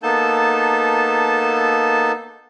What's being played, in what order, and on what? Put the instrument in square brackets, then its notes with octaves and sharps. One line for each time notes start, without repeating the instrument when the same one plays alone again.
[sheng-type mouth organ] A#3 B3 D#4 A4 A5 G6